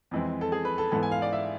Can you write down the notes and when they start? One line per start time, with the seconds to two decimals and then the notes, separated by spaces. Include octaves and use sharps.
0.11 F2 E3 G#3 C4
0.41 A4
0.52 G#4
0.65 B4
0.78 A4
0.91 G#2 E3 B3 A4
1.03 G#5
1.12 F5
1.22 D5
1.33 E5